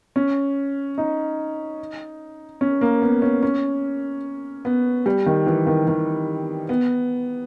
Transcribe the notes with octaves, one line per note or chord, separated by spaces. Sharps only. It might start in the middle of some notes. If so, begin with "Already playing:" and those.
C#4
D#4
C#4
A#3
B3
C#4
C#4
B3
G3
D#3
E3
D#3
D#3
B3